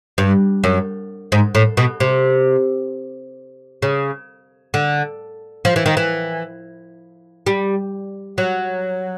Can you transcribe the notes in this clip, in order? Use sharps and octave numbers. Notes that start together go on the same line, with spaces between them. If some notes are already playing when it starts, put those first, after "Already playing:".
G2
F#2
G#2
A2
B2
C3
C#3
D3
F3
E3
D#3
E3
G3
F#3